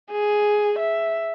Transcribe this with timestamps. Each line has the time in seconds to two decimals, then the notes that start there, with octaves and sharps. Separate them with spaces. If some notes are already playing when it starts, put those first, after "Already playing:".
0.11 G#4
0.79 E5